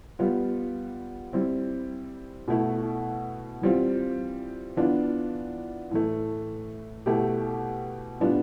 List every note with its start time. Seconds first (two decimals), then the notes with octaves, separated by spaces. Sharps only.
0.19 G3 B3 F4
1.33 G3 C4 E4
2.48 B2 A3 E4
3.62 E3 G3 C4 F4
4.77 E3 B3 D4 F4
5.91 A2 E3 A3
7.06 B2 A3 E4 G4
8.20 A2 G3 B3 D4 F4